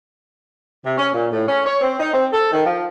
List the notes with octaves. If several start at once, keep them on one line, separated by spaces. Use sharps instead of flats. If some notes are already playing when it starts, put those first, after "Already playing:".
C3
C#4
A#2
A2
C#4
C#5
C4
D#4
C4
A4
D#3
F3